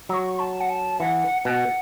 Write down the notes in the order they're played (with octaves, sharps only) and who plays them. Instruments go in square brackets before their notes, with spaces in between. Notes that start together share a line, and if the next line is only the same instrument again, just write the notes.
[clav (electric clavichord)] F#3 [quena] E6
[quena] C#6
A5
F#5
A5
[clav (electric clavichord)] E3 [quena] F#5
[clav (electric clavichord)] B2 [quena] A5
[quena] F#5